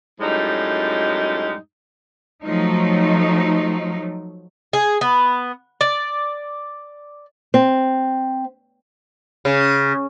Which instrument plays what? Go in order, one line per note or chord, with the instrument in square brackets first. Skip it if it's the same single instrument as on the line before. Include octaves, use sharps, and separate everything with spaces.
[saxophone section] F#2 A2 G3 G#3 D#4
[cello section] F3 F#3 A3 D#4
[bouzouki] G#4
B3
D5
[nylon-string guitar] C4
[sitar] C#3